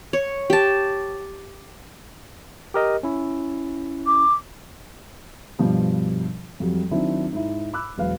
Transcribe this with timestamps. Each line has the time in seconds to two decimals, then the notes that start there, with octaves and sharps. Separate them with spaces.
0.13 C#5
0.50 G4 A5
2.74 G4 A#4 D#5
3.03 C#4 E4
4.06 D6
5.59 G2 B2 F3 G3
6.60 F2 F#3 G3
6.91 D#3 F#3 C4 D4 E4
7.33 G#2 E4
7.74 B5 D6 E6 F#6
7.98 E1 F#3 B4 F5